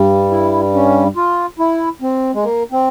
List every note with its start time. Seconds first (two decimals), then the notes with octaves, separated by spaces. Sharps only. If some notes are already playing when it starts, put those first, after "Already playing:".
Already playing: G2 G3
0.31 E4
0.74 C#4
1.16 F4
1.59 E4
2.02 C4
2.34 G#3
2.43 A#3
2.72 C4